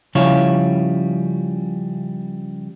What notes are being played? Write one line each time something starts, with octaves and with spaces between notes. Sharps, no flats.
C#3 F3 G3 E4 C#5 F5